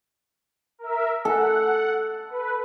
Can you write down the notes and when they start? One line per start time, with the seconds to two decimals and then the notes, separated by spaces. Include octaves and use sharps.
0.79 A#4 E5
1.25 A4 F#5
2.30 B4